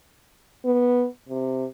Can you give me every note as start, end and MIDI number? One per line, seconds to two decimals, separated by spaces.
0.65 1.06 59
1.29 1.65 48